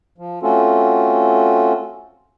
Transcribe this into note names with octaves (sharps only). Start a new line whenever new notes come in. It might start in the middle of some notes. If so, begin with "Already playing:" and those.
F3
A3 C4 C#4 F4 F#4 A4